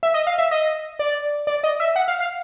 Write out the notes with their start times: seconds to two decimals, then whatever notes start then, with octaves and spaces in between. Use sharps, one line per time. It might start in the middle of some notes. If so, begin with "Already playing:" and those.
0.03 E5
0.14 D#5
0.27 F5
0.38 E5
0.51 D#5
0.99 D5
1.47 D5
1.64 D#5
1.80 E5
1.96 F#5
2.08 F5
2.20 F5